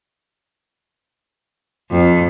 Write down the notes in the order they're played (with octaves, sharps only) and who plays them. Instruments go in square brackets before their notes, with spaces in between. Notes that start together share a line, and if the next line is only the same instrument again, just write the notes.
[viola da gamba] F2